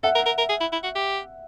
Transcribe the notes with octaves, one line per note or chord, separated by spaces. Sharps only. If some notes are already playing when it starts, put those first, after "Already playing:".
A4 E5 F#5
A#4
A#4
A#4
G#4
E4
E4
F#4
G4